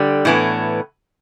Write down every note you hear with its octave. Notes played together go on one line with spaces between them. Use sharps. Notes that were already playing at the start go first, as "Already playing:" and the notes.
Already playing: D3 G3
A2 E3 B3